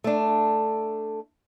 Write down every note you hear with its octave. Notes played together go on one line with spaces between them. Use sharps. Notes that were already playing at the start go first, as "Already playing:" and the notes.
A3 D4